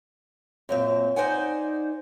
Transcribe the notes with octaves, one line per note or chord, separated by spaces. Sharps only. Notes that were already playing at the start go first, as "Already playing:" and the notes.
F#2 A#2 C4
D#4 C5 D5 F#5 G#5